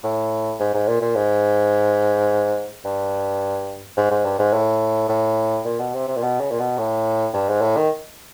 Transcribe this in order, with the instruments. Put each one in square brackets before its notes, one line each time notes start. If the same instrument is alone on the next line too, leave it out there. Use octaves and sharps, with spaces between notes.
[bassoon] A2
G#2
G#2
A#2
A#2
G#2
G2
G#2
G#2
G2
G#2
A2
A2
A#2
B2
C3
C3
A#2
B2
C#3
A#2
B2
A2
G2
G#2
A2
D#3